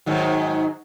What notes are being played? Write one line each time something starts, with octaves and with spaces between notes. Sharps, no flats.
G#2 D#3 F#3